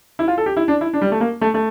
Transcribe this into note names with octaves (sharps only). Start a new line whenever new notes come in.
E4
F4
A4
G4
E4
D4
E4
D4
G3
A3
A#3
A3
A3